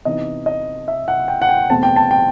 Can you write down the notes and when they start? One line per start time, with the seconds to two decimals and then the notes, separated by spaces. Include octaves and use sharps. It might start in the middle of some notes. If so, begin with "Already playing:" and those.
0.05 C3 E3 B3 D#4 D#5
0.46 D#5
0.88 E5
1.08 F#5
1.28 G5
1.42 F#5
1.49 G5
1.70 E2 B2 A3 C4 A5
1.83 G5
1.96 A5
2.11 G5